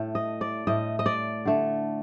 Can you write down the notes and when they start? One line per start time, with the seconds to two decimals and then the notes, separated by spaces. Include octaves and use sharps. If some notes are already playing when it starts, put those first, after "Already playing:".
Already playing: A2 A3
0.15 D#5
0.41 D5
0.67 A2 A3 D#5
0.99 D#5
1.06 D5
1.45 D3 A3